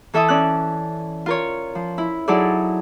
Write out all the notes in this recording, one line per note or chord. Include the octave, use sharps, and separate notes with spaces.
E3 A4 E5 A5 D#6
C#4 D5 F#6
F4 A#4 C#5
F3
E4
F#3 D#4 E4 G#4 A4 D5